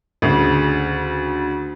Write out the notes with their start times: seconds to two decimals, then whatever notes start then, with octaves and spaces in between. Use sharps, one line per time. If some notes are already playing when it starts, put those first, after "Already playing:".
0.22 D2 C#3